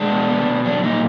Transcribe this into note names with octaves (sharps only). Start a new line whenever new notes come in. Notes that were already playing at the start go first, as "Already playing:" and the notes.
Already playing: G#3 D4
B2
B3
B2
F#3 D4
A#2 D#4